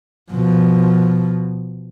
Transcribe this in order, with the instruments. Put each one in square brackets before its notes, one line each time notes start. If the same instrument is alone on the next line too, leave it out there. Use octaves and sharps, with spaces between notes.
[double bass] B2 F3